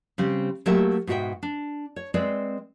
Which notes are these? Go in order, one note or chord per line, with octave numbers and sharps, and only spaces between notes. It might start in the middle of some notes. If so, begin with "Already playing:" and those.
C#3 G3 C4
F#3 A3 A#3 G4 E5
G#2 B2 F#4 G4 E5 G5
D4
C#5
G#3 C4 B4 D5 E5